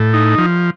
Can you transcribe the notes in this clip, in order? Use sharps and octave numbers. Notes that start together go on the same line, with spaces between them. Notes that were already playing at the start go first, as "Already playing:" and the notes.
Already playing: A2
D#4
F3